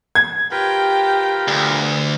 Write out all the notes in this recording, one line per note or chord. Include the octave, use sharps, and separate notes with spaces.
G#6
F4 G4 A#4 B4 G5
D2